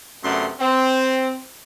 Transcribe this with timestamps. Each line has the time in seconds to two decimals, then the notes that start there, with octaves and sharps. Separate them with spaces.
0.24 F#2 C3 A3 B3 D4 C6
0.60 C4